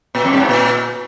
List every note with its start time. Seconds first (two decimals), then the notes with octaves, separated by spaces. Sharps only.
0.15 A#2
0.25 F2
0.33 G2
0.40 G#2
0.49 A#2